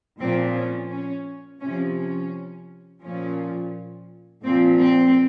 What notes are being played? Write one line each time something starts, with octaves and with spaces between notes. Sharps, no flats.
A#2 F3 C4
C#4
C#4
C3 F3 C#4
C#4
A#2 F3 C#4
A#2 F3 C4
C4